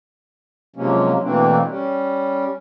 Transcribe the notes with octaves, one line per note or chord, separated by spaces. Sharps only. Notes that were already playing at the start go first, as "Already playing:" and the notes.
C3 F3 F#3 G#3 A#3 C#4
B2 E3 A3 A#3 C4 D4
G3 C#4